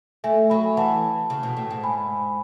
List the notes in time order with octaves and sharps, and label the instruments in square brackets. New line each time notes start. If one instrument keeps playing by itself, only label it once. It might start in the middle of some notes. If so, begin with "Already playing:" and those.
[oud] A3 [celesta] E5 G#5
[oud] F#3 [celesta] G#5 B5
[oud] E3 [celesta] F#5 A5
[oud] C#3
B2
A2
G#2
[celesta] G#5 B5